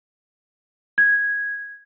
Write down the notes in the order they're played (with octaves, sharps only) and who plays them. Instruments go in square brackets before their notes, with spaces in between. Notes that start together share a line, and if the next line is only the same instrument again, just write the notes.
[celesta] G#6